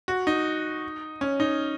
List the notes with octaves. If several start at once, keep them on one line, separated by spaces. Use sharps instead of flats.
F#4
D#4
C#4
D#4